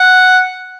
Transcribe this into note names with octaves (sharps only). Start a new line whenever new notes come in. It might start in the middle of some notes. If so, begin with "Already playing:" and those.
Already playing: F#5